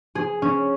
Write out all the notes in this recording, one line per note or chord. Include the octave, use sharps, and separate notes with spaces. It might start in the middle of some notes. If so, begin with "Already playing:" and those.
G#4
C#4